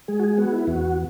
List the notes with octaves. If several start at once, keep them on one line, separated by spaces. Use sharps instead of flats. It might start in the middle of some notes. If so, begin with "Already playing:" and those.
G#3 G#4
F#4
G#4
B3 F#4
E4
E2 F#4